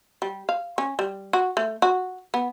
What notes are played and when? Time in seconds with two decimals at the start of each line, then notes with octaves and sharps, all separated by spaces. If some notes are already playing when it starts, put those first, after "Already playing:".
0.22 G3
0.49 F5
0.78 C#4
0.99 G3
1.33 F#4
1.57 A3
1.82 F#4
2.34 B3